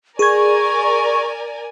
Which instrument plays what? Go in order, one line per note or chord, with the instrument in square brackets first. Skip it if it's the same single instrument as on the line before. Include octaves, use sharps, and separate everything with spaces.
[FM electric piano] G#4 G#6 [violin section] A#4 D5 G#5 [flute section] C#6